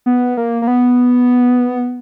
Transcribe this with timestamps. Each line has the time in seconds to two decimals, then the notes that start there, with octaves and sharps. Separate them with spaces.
0.06 B3
0.37 A#3
0.62 A#3
0.68 B3